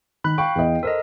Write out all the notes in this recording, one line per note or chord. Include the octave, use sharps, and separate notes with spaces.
D#3 B5 F#6
F5 G5 C#6
E2 D#5
A4 A#4 C5 D#5